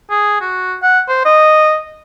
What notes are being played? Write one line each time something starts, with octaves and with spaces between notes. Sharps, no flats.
G#4
F#4
F#5
C5
D#5